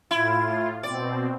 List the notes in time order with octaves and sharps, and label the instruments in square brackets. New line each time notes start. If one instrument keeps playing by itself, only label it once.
[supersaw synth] A2 F4 [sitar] E4
[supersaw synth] B2 C4 [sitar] D5